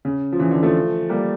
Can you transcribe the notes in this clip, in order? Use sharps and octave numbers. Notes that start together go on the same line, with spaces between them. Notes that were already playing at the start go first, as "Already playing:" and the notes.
C#3
F3
C#3 E3
D3
F3 A3
G3 A#3